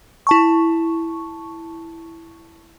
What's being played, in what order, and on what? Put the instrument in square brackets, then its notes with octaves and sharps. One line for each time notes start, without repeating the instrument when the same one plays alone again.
[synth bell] E4 A5 C#6